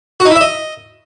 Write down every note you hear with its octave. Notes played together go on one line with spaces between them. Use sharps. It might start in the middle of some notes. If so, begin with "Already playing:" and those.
F#4
D#4
E4
E5
D#5